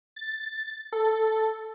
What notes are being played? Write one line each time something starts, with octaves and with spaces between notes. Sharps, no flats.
A6
A4